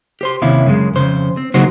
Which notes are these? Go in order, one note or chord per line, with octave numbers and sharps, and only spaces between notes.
G4 C5 C6
D#2 C3 C#4 E4 F5
F#2 C#3 G#3
F2 C#3 C5
C4
C#3 F#3 A#3 D#4 F#4 C5